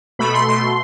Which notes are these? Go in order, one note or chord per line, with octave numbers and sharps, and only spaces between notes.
B2 A3 B5
C6
B2 A3 C6